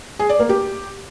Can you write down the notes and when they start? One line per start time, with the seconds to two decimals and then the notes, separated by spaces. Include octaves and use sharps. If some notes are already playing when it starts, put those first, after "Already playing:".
0.19 G#4
0.29 D5
0.39 A#3
0.49 G4